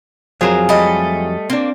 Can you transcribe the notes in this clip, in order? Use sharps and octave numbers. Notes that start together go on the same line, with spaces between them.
F2 F#3 F4 G#4 A#4 C5
G3 A3 D#5
A#3 C4 D4